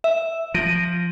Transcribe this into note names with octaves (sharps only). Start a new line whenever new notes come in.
E5
F3 A#6 D7 D#7